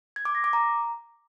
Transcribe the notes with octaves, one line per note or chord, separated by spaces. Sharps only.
G#6
D6
A#6
D6
A#5